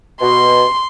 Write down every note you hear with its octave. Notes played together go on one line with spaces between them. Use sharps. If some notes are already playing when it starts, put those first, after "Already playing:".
B2 C6